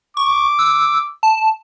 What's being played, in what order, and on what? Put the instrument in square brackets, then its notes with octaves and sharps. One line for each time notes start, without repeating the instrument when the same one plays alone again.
[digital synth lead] C#6 [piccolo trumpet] D6
[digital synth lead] E6
A5